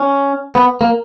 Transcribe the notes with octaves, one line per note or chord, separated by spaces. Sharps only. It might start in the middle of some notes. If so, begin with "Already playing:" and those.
Already playing: C#4
B3
A#3